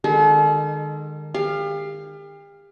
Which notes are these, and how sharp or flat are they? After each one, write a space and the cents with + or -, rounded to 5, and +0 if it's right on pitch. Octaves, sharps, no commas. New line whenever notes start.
D#3 -40 G#3 -15 A4 -45
G4 +40 F5 +0